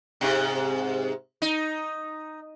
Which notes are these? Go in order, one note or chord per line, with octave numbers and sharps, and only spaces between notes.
G#2 C3
D#4